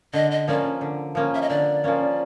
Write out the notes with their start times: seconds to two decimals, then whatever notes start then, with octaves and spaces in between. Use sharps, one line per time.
0.13 D3 D#5
0.31 D#5
0.48 F3 A#3 C#4 D5
0.81 D3
1.15 F3 A#3 C#4
1.35 E5
1.42 D#5
1.49 D3 D5
1.84 F3 A#3 C#4